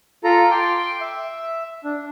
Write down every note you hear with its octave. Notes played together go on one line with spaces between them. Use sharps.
F4 A4 A#5
G5 C6 D6
E5
D4